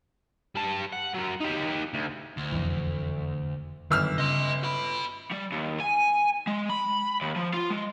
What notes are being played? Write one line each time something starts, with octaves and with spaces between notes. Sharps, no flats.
G3 A5
F#5
F#3 A#4
D#4 G4
D2
D2
E1 F2 E3
G1 F#2 D3 D#3 E6 F6
C#3 D#5 C6
F#4 B5
G3
D#2
G#5
G#3
B5
D#2
F3
F4
G#3